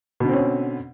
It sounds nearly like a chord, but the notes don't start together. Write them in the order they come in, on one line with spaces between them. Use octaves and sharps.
B2 D3 C4 C#4